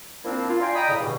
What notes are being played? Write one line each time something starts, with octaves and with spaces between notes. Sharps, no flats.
F3 A#3 C4 D4 E4
F4
D5 F5 G5 G#5 A#5 C6
D5 D#5 G5 A#5 B5 D#6
A2 C#3
E2 G2 B2 D3 E3